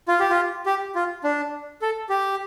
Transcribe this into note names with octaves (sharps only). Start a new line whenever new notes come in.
F4
G4
F4
G4
F4
D4
A4
G4